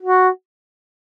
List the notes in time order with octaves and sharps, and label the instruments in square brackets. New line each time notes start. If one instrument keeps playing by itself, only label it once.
[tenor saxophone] F#4